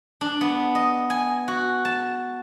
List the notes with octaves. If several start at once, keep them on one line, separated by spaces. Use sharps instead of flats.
D4
B3
D#5
G#5
F#4
A5